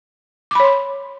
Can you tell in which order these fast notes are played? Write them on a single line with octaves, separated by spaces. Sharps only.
D6 B5 C#5 C6